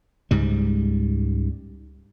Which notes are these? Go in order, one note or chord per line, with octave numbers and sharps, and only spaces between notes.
C#2 G#2 G3